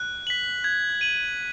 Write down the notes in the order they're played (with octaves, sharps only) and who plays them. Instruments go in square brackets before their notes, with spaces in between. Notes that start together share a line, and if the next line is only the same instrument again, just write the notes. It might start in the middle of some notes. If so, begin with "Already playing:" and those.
Already playing: [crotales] F#6
B6 F#7
G#6
D#7 F#7